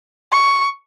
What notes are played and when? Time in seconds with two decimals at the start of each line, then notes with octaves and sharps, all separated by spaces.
0.32 C#6